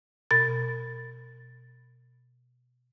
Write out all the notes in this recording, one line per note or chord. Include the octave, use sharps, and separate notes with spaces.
B2 A6